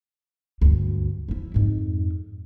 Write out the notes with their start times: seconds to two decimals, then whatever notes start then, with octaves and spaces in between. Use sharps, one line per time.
0.61 D2 G2
1.28 F3 E4
1.54 F2 G#2